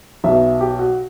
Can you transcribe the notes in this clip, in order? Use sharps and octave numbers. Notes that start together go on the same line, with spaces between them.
B1 B2 E5
G4
F#4